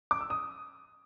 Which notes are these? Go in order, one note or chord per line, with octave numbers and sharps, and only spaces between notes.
D6
E6
D#6